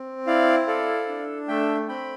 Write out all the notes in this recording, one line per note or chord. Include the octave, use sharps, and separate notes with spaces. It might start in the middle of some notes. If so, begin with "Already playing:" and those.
Already playing: C4
E4 D5 F5
A4 D5 F5
D4
A3 E5 G5
C4 G5 B5